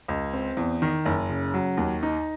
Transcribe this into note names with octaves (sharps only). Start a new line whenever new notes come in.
C#2
C4
E2
D#3
F#1
C#3
F#3
D#2
D#4